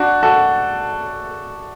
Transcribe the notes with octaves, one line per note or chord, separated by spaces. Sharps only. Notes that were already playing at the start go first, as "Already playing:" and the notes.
Already playing: D4 F#4
F#4 A4